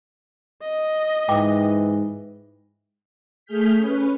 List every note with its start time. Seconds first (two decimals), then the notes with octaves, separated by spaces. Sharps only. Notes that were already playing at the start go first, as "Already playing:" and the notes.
0.62 D#5
1.29 G#2 E3 G5 D6
3.45 A3 G#4 F6 G6 B6
3.77 C#4 B4